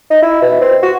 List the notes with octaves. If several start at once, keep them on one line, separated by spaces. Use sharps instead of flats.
D#4
E4
B2
C4
F#4